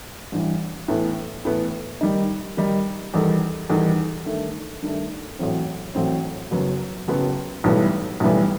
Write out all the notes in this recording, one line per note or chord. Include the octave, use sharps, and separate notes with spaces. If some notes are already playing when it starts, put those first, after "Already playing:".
A1 G2 E3 G3
A2 E3 B3
A2 E3 B3
D#3 G3 D#4
D#3 G3 D#4
E2 D#3 G3 D#4 A4
E2 D#3 G3 D#4 A4
G2 D#3 A3
G2 D#3 A3
A1 A2 F#3 C4
A1 A2 F#3 C4
F#1 F#2 F#3 B3
F#1 F#2 F#3 B3
B1 A2 E3 G3 B3
B1 A2 E3 G3 B3